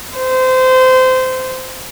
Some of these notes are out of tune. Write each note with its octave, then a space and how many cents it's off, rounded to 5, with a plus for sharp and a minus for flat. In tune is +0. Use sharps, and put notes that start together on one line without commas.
C5 -25